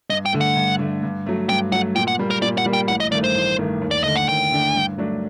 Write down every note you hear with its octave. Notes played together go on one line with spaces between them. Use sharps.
G2 D#5
G5
D3 A3
F#5
G2
D3 A3
G2
F#3 A3
G2 G5
F#3 A3 F#5
A#2 G5
F#5
G3 A#3
A#4
A#2 D5
F#5
G3 A#3
G5
A1 F#5
D#5
G2 D#3 A3 D5
C5
A1
G2 D#3 A3
D#2
D5
D3 A3 D4 D#5
F#5
D#2 G5
D3 A3 D4
G2
F#3 A3 D4 F#4